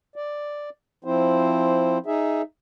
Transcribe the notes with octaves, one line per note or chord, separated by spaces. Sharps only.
D5
F3 C4 E4 C5
D#4 G#4 E5